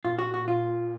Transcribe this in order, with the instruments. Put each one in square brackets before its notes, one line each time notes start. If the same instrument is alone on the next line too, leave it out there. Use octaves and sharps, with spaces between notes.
[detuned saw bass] A#2 [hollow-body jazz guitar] F4
[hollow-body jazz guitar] F#4
F#4
F4